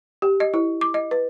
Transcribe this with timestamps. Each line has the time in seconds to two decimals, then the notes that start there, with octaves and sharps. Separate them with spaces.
0.22 G4
0.40 D#5
0.54 E4
0.81 D6
0.94 D#5
1.11 B4